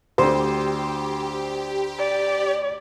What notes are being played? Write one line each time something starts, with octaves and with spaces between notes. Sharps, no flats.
D2 D3 G4 C5
D5